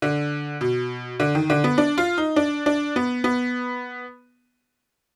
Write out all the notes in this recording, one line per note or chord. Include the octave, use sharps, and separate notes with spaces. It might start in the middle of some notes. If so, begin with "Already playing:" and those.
D3
B2
D3
D#3
D3
B3
D4
F4
D#4
D4
D4
B3
B3